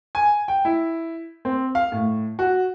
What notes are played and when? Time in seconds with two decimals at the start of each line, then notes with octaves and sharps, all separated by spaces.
0.15 G#5
0.48 G5
0.65 E4
1.45 C4
1.75 F5
1.92 A2
2.39 F#4